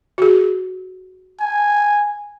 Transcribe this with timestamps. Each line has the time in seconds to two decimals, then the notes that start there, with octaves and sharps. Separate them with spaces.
0.18 F#4 G#4
1.40 G#5